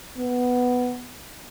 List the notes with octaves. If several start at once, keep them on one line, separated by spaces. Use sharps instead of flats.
B3